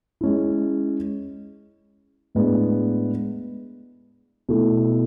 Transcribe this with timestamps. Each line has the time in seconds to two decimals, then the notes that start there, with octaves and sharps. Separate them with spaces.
0.21 G#3 C#4 E4
2.35 A2 G#3 B3 D4
4.49 B2 A3 E4